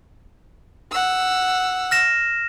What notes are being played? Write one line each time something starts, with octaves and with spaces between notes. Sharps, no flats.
F#5 E6
F6 A#6 E7